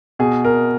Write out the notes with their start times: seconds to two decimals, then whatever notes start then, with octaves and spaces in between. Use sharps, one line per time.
0.19 B2 G#4
0.44 A#4